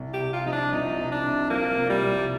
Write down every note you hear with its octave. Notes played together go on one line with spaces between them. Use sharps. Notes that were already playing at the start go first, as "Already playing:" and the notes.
Already playing: C2
G4
C3
F4
F3 D#4
D4
C2 D#4
C2
D4
C3
F3 A#3
C2
G3
C2